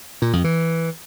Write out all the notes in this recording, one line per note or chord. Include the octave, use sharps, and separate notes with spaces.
A#2
F2
E3